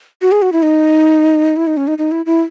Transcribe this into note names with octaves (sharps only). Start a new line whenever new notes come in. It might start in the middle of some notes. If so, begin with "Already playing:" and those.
F#4
G#4
F#4
E4
D#4
E4
D#4
C#4
D#4
D#4
E4
E4